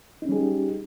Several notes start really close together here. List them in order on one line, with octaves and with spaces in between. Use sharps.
D#4 C#4 G3 G#4 G4